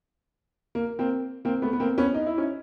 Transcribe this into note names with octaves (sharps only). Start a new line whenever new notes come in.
A#3
A#3 C4
A#3 C4
A3 B3
B3
A#3 C4
B3 C#4
D#4
E4
C#4 D#4